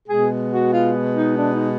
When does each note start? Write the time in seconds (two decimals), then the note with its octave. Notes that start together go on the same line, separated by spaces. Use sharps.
0.07 B2 G#3 B3 G#4
0.51 F#4
0.73 F4
1.16 D#4
1.38 D4
1.54 D#4